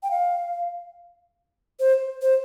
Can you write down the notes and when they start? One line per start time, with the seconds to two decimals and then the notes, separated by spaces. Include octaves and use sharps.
0.03 G5
0.11 F5
1.80 C5
2.22 C5